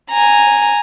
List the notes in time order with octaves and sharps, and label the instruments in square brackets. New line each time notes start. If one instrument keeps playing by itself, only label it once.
[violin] G#5 A#5